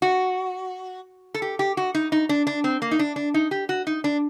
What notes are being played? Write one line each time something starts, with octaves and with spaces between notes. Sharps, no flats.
F#4
A4
G4
G4
F#4
D#4
D#4
D4
D4
C4
A#3
D#4
D4
D4
D#4
G4
F#4
D#4
D4